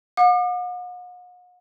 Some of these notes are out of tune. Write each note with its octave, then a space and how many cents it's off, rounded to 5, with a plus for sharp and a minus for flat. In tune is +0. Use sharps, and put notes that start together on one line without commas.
F#5 -45 D6 +40